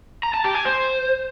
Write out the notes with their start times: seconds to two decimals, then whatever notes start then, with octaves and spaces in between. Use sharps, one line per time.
0.23 A#5
0.34 A5
0.44 G4
0.55 G#5
0.65 C5